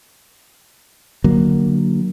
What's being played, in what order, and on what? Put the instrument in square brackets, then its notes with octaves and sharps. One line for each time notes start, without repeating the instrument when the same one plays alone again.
[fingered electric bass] D3 F#3 A#3